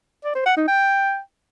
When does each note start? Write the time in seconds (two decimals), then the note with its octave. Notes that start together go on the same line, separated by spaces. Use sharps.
0.24 D5
0.35 C5
0.46 F#5
0.57 D#4
0.68 G5